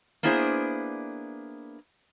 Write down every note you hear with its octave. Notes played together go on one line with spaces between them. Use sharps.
A#3 B3 D4 E4 G#4 C5